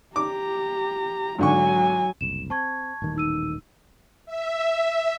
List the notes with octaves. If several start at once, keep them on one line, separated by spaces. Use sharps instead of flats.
G4 A#5 D6
G#1 D3 F#3 G#5 C#6
F#1 C2 E7
C4 A5 C#6 G#6
D#1 A1 D#3
D#4 E6 D#7
E5